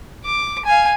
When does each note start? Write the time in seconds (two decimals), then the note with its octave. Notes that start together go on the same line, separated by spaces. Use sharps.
0.25 D6
0.65 F5 G#5